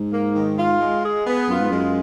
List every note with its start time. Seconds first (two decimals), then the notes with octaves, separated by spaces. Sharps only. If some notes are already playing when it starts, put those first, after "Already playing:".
Already playing: G#2
0.12 A#3
0.35 D#3
0.57 F4
0.80 G#3
1.04 G#4
1.26 B3
1.48 F#2 F4
1.59 G#2
1.70 F#2 G#3